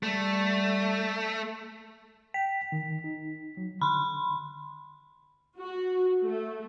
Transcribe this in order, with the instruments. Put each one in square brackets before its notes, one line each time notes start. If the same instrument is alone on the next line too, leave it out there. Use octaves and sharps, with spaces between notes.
[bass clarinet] G3 [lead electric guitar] A3
[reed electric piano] G5 [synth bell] B6
[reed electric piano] D#3
D#4
F#3
[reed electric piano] D3 [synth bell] B5 C6
[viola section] F#4
A3